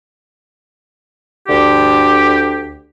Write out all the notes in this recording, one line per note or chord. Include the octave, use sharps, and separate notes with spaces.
D2 D3 G4